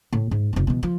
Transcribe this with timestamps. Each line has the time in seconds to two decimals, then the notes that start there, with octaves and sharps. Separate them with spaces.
0.13 A2
0.31 G#2
0.53 F1 D#4
0.67 B2 E3
0.83 F3